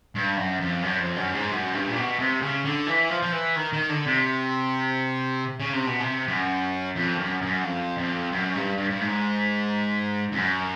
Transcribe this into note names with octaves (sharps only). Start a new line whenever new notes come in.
G2
F#2
F2
F#2
F2
F#2
G#2
F#2
G2
A#2
B2
C3
C#3
D3
E3
F3
F3
E3
D#3
D#3
D3
C3
C#3
C3
B2
C3
F#2
F2
F#2
F#2
F2
F2
F#2
G2
G2
G2
G#2
F2
F#2